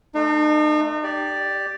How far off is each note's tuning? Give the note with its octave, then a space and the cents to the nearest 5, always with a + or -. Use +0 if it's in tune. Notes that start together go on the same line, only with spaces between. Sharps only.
A3 +0 D#4 -40
G4 +0 D5 +0